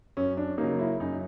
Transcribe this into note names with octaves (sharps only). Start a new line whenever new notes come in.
F#2 C#4
D4
C#3 F#3 A#3 D#4
E4
F#2 D#4